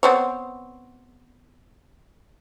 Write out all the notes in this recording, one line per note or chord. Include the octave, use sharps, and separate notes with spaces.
B3 C4 C#5